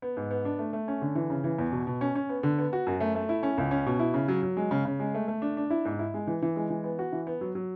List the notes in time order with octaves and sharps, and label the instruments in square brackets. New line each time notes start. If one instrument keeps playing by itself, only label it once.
[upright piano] B3
G#2
B3
D4
A3
A3
C#4
D3
E3
C#3
E3
E2
B2
B2
C#4
C#4
B3
D3
B3
F#4
F#2
A3
A3
E4
C#4
C#2
C#4
B2
E4
C#3
F#3
F#3
G#3
C#3
C#3
G#3
A3
A3
D4
D4
E4
G#2
E4
G#3
E3
E3
G#3
E3
B3
F#4
E3
B3
F#3
F#3